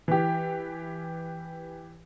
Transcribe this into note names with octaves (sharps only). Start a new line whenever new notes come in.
E3 G4